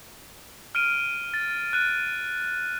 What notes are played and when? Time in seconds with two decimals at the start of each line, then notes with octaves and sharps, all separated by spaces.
0.75 F6 D7 D#7
1.34 A6
1.73 F#6 D#7